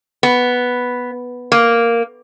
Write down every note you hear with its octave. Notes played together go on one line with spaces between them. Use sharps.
B3
A#3